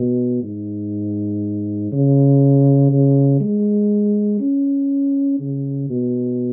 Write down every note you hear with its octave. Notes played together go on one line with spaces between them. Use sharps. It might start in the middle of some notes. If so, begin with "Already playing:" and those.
Already playing: B2
G#2
C#3
C#3
G#3
C#4
C#3
B2